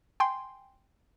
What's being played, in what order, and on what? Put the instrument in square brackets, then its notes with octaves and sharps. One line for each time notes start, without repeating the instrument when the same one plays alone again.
[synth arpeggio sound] G5 G#5 C6